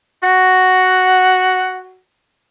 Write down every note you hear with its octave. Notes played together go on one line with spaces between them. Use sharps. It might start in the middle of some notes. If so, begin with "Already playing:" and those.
F#4 F#5